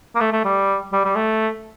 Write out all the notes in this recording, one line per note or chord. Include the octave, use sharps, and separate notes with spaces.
A#3
A3
A3
G3
G3
G3
A3